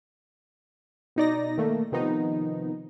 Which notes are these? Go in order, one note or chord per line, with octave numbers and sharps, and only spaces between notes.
B2 D#4 D5 A#6
D#3 A3 A#3
C3 D#3 F3 B3 D#4